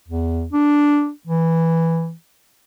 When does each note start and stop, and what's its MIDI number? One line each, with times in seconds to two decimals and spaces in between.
0.08 0.45 40
0.52 1.10 62
1.27 2.12 52